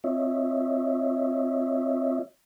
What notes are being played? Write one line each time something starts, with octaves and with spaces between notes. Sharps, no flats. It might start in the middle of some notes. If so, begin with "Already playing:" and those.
C4 F4 C#5 D#5 E5